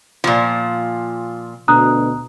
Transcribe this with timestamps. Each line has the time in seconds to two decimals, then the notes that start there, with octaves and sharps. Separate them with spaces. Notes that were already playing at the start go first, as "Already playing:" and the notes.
0.24 A#2 F3
1.68 D2 B2 A#5 D#6 F#6